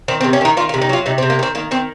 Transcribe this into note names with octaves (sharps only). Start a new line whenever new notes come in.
D#3 C4
C4
C3
C#4
D#3 D#4
D#3 F4
F4
C3
D#4
F#3 F4
C3 D#4
C4
C3
A#3
D#3 C4
D#3 A#3
D#3 C4